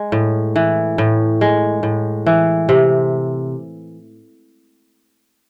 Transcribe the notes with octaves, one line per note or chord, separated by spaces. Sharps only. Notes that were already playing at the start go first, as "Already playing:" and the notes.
Already playing: G#3
A2
E3
A2
G#3
A2
E3
C3